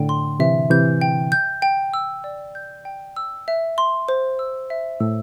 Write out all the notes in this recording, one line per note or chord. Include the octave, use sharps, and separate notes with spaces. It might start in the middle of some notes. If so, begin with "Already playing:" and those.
Already playing: A2 D3 G5
C6
C3 E3 E5
C3 E3 G6
G5
G6
G5
E6
D5
G6
G5
E6
E5
C6
C5
E6
E5
A2 E6